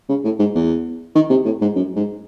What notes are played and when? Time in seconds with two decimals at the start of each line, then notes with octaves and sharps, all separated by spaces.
0.09 C#3
0.24 A2
0.39 G#2
0.55 E2
1.15 D#3
1.30 C3
1.45 A2
1.61 G#2
1.76 F#2
1.96 G#2